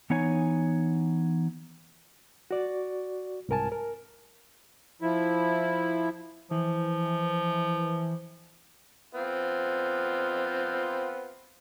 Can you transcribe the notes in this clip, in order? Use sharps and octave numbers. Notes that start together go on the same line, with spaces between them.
E3 B3 D#4 C#5 G#5
F#4 D5
C2 G#2 A#4 G#5 A5
A#4
F3 E4
E3 F3
B3 C4 F4